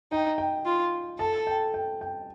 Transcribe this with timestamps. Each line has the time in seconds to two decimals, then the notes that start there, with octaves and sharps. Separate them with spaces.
0.12 D#4 G5
0.38 G5
0.65 F4
1.19 A4 A5
1.47 G5
1.74 G5
2.01 G5